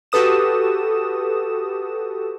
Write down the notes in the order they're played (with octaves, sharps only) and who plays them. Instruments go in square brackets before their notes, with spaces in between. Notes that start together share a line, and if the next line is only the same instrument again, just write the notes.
[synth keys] F#4 G4 A4 B4 D#6 E7